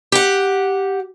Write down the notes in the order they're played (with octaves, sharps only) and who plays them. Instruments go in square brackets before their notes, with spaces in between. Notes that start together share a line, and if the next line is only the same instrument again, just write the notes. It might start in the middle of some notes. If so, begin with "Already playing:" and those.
[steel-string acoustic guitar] G4 F#5